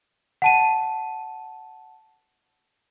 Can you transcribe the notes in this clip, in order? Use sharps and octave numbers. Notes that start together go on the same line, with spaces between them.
F#5 A5 D#7